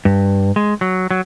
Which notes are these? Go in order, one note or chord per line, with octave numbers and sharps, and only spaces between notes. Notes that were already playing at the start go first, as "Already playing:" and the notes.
G2
G#3
F#3
F#3